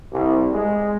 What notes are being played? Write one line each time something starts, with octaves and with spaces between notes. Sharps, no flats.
C2
G#3